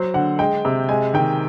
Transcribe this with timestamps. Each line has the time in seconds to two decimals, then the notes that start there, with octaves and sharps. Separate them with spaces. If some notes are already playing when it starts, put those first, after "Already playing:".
Already playing: F#3 C5
0.14 D3 F#5
0.39 G#3 G5
0.65 C3
0.89 G#3 G#5
1.14 D#3 G5